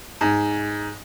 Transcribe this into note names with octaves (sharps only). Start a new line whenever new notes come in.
G#2